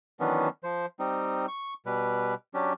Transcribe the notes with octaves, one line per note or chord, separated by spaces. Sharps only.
D#3 E3 F#3 B3 C#4 D4
F3 C5
G3 C4 D#4
C#6
B2 G3 B4
F#3 C#4 D4 G4